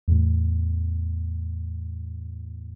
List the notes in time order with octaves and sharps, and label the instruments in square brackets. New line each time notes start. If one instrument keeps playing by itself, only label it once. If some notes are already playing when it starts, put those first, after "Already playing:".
[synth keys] E2 A2